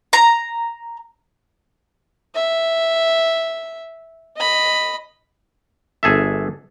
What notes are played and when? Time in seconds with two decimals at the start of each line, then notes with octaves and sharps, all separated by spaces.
0.13 A#5
2.35 E5
4.37 D#5 B5
6.03 G1 G#4 A4 E5